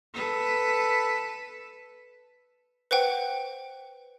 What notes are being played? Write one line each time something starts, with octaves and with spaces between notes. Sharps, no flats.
A4 B4
B4 C5 F#5 G5